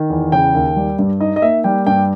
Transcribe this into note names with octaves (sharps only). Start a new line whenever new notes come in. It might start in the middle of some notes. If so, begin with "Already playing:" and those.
Already playing: D#3
E2
C#3 G5
D#2
G3
G2
D#4 D#5
D#5
A#3 E5
G3 G5
G2 G5